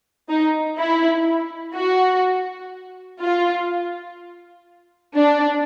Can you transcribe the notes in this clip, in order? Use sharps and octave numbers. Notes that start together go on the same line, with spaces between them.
D#4
E4
F#4
F4
D4